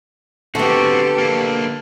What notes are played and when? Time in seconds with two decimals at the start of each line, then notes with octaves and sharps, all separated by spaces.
0.55 D3 B3 C4 F#4 G4 A4
1.18 A#3 D4